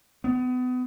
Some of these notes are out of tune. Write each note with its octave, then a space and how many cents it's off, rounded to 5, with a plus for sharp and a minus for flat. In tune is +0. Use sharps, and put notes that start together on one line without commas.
B3 +30